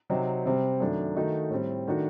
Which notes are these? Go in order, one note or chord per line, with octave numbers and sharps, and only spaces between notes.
C3 F#3 C4 D#4
C3 G3 C4
F#2 D#3 A3 D4
D#3 A3 D#4 F#4
A2 G3 C4
D#3 A3 D4 F#4